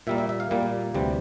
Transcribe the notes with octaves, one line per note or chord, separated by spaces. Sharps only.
A#2 G3 A#3 E5
E5
E5
F5
A#2 G3 A#3
D2 C3 E3 G3